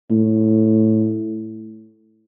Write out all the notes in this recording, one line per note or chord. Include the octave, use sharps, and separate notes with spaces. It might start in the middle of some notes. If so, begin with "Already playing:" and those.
A2